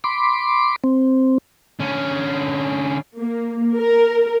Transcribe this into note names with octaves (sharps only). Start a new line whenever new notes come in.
B5 C6 D6
C4
D3 C#4
A#3
A#4